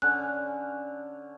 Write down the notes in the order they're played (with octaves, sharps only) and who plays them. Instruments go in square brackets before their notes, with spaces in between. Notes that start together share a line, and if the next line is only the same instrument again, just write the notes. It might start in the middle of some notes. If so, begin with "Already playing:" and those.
[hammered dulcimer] D3 C#4 [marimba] F#6